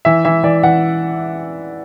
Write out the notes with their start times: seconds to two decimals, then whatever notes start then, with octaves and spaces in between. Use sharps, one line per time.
0.05 E3 E5
0.25 E3 E5
0.43 E3 D5
0.63 E3 F#5